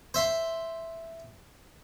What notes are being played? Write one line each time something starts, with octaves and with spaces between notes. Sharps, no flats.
C5 E5 C6